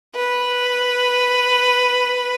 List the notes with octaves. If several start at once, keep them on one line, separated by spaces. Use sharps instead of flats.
B4